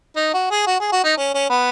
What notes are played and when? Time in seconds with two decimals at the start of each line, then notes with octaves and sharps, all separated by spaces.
0.16 D#4
0.34 F#4
0.51 G#4
0.67 F#4
0.80 G#4
0.92 F#4
1.04 D#4
1.17 C#4
1.34 C#4
1.50 B3